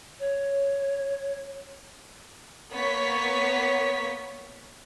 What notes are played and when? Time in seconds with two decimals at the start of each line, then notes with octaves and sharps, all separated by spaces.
0.19 C#5
2.72 A#3 B3 C#5 C#6 B6